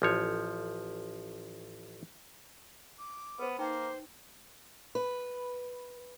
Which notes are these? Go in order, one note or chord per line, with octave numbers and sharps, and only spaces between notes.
A1 F3 C#5
D6
B3 B4 C5
A#3 D#4 C5 G5
B4